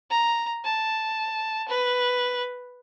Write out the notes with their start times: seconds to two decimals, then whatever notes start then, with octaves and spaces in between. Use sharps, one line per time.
0.10 A#5
0.65 A5
1.68 B4